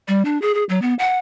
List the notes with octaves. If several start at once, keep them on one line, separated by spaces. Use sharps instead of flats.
G3
D4
G#4
G#4
F#3
B3
F#5